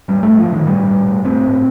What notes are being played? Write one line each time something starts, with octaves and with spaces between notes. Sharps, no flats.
A2 G3
A2 A3
F3
A2
D#3
A2 G3
A2
A2
A2 C4
A2